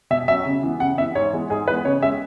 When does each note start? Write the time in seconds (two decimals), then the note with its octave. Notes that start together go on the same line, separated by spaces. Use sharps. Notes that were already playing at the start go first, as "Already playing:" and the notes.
0.11 B2 E5
0.28 F#3 C#4 E5
0.46 C#3
0.63 E3 B3
0.80 C#3 F#5
0.98 E3 B3 E5
1.15 G#2 C#5
1.33 E3 G#3 B3
1.50 G#2 G#4
1.68 E3 G#3 B3 B4
1.85 C#3 C#5
2.02 G#3 C#4 E5